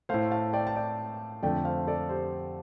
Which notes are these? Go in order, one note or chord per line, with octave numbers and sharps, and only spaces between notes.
A2 A3 C5 F5
F5 A5
D5 G5
A5
D5 G5
F2 D3 A3 D5 G5
C5 F5
A4 D5
G4 C5